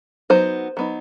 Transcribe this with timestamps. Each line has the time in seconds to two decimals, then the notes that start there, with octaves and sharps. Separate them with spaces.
0.30 F#3 B3 D#4 C5
0.77 F#3 B3 D#4